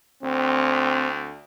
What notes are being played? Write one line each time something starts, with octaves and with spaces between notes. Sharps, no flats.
D2 C4